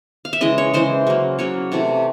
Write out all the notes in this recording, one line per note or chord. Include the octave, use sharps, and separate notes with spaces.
F5
E5
C#3 E3 G#3 D#5
C#5
C#3 E3 G#3 C5
C#3 F#3 A#3
C#3 F#3 A#3 C#5
C3 E3 A3